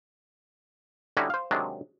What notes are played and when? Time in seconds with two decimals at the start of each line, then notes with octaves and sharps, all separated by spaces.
1.17 D3 G3 C#4 D#4 E4 F#4
1.30 C5 F5
1.51 C3 D#3 F#3 G#3 D4